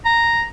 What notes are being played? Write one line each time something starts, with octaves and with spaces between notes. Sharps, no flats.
A#5